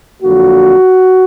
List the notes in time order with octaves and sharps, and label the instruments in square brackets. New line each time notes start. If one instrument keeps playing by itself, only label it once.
[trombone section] F2 D3 F#3 A#3 F#4